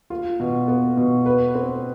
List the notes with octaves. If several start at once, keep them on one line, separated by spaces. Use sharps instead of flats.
F4
B2
B3
B2
B4
C4